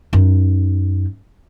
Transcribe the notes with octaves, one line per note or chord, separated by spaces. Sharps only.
F#2 D#4